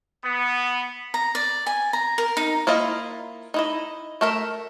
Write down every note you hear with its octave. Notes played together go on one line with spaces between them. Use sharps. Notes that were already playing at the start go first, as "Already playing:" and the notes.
B3
A#5
D5
G#5
A#5
A#4
D#4
A#3 E4 F4 D#5
D#4 E4 D#5
A3 A#4 E5